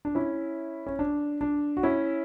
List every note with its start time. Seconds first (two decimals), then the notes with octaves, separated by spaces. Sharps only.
0.05 D4
0.15 C#4 E4
0.87 C#4
0.99 D4
1.41 D4
1.77 F#4
1.83 C#4 E4